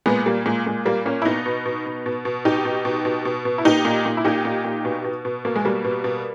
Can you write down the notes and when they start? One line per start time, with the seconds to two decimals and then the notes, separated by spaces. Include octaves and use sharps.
0.06 A#2 G#3 B3
0.26 A#2 G3 A#3
0.46 A#2 G#3
0.66 A#2 G#3
0.85 A#2 G3 A#3
1.06 A#2 A#3 C#4
1.22 E4
1.25 B2 B3 D#4
1.46 B2
1.66 B2
1.86 B2
2.06 B2
2.25 B2
2.45 B2 D#4 G4
2.65 B2
2.85 B2
3.05 B2
3.25 B2
3.45 B2
3.58 E4
3.65 A#2 D#4 G4
3.85 A#2
4.06 A#2
4.17 E4
4.24 A#2 D#4 G4
4.45 A#2
4.65 A#2
4.85 B2
5.04 B2
5.25 B2
5.45 B2 A#3
5.56 G#3
5.65 B2 G3 A#3
5.84 B2
6.04 B2